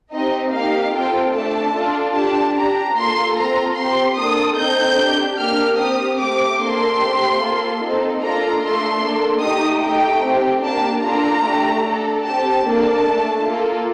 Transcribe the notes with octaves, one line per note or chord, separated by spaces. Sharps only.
C4 D#4 G4 D#5
A#3 D#4 G4 F5
C4 F4 A4 G5
A3 D4 A4 A5
D4 F4 A4
D4 G4 A5
D4 G4 A#5
A#3 F4 A4 C6
C4 F4 A4 A#5
C4 G4 C6
A#3 D4 A4 D#6
C4 D#4 A4 G6
D4 G4
A#3 D4 G4 F6
C4 G4 D#6
A3 C4 G4 D6
A#3 D4 A4 C6
A3 C4 G4
A#3 F4 A4
C4 D#4 A4
A#3 D4 F4 A4 A#5
A3 D4 A4 C6
A#3 D4 A4
A3 D#4 G4 D#6
A3 D#4 G4 G5
C4 G4
A#3 D4 G4 A5
D4 F4 A4 A#5
A3 D4 G4
D4 A4
C4 G4 A5
A#3 D4 A4 A5
A3 D4 A4
A#3 F4 A4